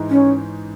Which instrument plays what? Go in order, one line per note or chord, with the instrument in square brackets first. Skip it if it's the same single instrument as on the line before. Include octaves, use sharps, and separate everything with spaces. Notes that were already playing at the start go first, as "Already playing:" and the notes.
Already playing: [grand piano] G#2 E3 G#3 D#4
[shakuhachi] C#4